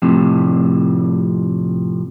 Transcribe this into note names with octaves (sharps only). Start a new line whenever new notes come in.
F2 A2 C3